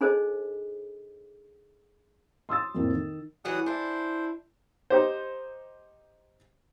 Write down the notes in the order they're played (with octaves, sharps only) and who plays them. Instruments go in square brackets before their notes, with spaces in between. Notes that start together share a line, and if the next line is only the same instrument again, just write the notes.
[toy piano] D4 D#4 G#4 A4 C5 D#5
[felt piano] C6 D#6 E6 A6
F2 A2 A#3 C4
D#3
[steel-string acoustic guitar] E3 F#3 G3 [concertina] F#5 D#6
[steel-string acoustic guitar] D4 E4 [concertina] C5
[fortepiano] D#4 G4 C5